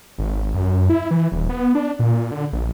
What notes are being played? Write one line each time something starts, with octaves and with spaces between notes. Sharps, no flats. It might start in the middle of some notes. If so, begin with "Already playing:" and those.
G#1
F#2
E4
E3
D#1
B3
D4
A#2
D3
A#1